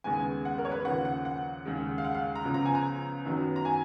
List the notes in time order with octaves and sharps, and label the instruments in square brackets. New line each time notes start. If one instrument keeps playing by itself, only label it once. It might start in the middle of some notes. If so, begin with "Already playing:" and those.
[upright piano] D#2 C#3 G#3 B3 G#5
F#5
A#4
C#5
B4
D#2 C#3 F3 A#3 F#5
F#5
F#5
D#2 C#3 G#3
F5
F#5
F5
A#5
C#2 C#3 F3 B3
A#5
G#5
A#5
F#2 D#3 F#3 B3
A#5
G#5